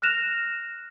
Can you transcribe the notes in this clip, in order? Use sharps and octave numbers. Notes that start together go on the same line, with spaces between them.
F6 F#6 A#6 E7 F7